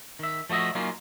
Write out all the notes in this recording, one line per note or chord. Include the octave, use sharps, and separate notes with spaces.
D#3 E5
F3 A3 F#4 D#5 E5
F#3 A#3 C#4 D#4 F4